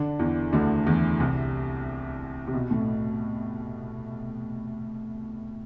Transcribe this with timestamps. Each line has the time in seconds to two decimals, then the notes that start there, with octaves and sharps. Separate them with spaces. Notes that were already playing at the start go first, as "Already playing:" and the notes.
Already playing: D3 D4
0.19 E2 E3
0.53 D2 D3
0.86 E2 E3
1.20 C2 C3
2.47 C3
2.54 B2
2.71 A2